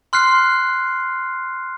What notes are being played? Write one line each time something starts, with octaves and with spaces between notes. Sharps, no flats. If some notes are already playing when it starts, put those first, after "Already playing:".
C6 F6 F#6 C7